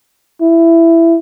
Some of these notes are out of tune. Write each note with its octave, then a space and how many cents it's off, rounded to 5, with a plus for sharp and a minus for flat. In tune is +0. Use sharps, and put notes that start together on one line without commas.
E4 +10